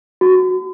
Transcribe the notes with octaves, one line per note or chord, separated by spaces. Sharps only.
F#4